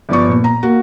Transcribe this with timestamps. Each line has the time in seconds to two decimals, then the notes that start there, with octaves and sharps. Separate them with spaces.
0.09 G1 F3 D5 C#6
0.30 A#2
0.44 A#5
0.63 A#3 F#4